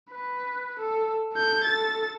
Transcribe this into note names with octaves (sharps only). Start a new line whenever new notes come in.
B4
A4
A4 G6
A4 A6